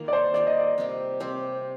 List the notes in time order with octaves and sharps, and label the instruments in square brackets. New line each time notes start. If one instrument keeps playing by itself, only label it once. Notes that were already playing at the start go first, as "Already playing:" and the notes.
Already playing: [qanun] D#3 A#3 F4
[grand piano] D5
C5
[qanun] D#3 A#3 F4 [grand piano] D5
[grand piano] D#5
D5
[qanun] C3 G3 C4 G4
[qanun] C3 G3 C4 G4 [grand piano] C5